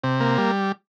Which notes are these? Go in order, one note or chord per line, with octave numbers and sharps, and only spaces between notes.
C3
A#3
G3